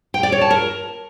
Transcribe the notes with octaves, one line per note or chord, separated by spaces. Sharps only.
G5
D5
C#5
A5
A#4